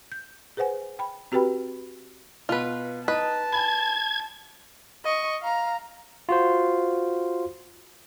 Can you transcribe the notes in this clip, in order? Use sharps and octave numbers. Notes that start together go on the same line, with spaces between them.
G6
G#4 B4 C5 F#5 G#5
G5 B5
C4 F#4 G4 B4 G5 B5
B2 F4 B4
D#4 B4 D#5 A5
G#5 B5 G#6
D#5 C#6
F5 A#5
F4 F#4 C5